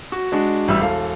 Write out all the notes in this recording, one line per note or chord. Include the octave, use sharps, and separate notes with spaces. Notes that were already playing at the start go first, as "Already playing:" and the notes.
F#4
G#3 D4 F#4
A1 G3 E5 E6
E1 A4 F5